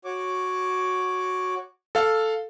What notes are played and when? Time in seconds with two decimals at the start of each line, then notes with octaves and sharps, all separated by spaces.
0.05 F#4 C#5 D6
1.95 A4 F5